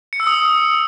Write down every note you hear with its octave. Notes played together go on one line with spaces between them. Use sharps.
C#7
E6
D#6